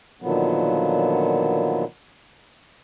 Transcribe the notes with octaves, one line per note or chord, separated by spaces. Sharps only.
A#2 D3 D#3 F3 F#3 B3